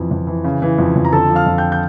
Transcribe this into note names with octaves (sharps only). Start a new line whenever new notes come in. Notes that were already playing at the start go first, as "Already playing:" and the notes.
Already playing: F2 E3
F2
E3
C#3
E3
F2
F2
A#5
D3 A4 A5
F3
F5 F6
F2
G5 G6
G6